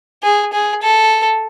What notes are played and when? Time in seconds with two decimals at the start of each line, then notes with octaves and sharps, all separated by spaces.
0.23 G#4
0.53 G#4
0.82 A4